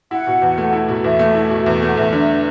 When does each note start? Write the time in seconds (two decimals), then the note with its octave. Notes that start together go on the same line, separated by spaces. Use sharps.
0.11 E4 F#5
0.27 B2
0.42 E2
0.58 A3
0.73 E4
0.88 B2
1.04 E2 E5
1.19 A3
1.34 E4
1.50 B2
1.66 E2
1.82 A3 F#5
1.97 E2 E5
2.13 D3